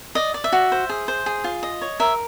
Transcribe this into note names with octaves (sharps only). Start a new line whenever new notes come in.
D5 D#5
D5
E5
F#4
C5
G#4
C5
G#4
F4
D#5
C#5
A#4 E5